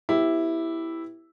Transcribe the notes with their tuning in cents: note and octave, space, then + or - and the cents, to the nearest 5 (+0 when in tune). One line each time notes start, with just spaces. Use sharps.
B3 +0 E4 +0 G4 +0